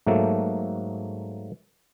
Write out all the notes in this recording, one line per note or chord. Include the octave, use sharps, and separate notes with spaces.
G#2 F#3 A3 A#3 A4